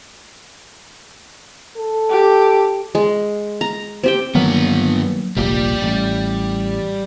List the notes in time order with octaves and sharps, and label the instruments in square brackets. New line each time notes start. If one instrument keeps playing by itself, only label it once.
[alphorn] A4
[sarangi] G4
[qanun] G#3
A#5
C4 G4 G5
[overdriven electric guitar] G2 B3 [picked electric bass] D#3 F#3 A#3
[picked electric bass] F1 A#1 A#2 [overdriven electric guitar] G3 G4
[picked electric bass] A1